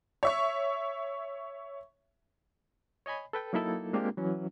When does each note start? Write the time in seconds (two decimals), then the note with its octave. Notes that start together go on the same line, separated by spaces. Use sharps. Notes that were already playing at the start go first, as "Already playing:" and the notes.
0.23 C#5 E5 C#6
3.06 C#5 D#5 G#5 B5
3.33 A4 B4 G5
3.53 F#3 A#3 D#4 E4 A4
3.93 G#3 A#3 C4 D4 F4 G4
4.17 E3 F#3 C#4